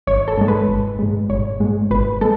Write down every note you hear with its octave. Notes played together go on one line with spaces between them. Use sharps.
G#1 C#5
A4
G#2 G#3
B4
G#1
G#2 G#3
G#1 C#5
G#2 G#3
G#1 B4
G#3 A4